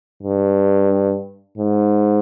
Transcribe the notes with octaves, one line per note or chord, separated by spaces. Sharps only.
G2
G#2